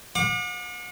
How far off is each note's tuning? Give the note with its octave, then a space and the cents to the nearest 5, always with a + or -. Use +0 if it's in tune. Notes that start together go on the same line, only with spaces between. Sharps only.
F#5 -40 D6 +30